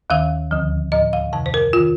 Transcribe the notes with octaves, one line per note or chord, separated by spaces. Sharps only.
D#2 D#3 F5
D2 D3 F3
A2 F3 D#5
F5
F2 C3 D#3 A5
C5
A#4
D#3 F4